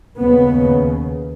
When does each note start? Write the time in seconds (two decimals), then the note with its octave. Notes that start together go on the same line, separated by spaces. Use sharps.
0.20 D#2 C#3 B3